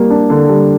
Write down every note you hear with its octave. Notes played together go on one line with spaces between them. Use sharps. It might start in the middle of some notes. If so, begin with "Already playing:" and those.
Already playing: G3 A#3
D4
D3
G3